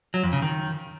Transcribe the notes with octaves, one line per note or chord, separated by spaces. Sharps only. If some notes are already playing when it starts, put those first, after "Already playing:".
F#3
F2
C#3
D#3